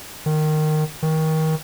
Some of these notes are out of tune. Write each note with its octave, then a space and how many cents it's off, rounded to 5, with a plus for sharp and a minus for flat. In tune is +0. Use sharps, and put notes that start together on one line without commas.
D#3 -15
D#3 +25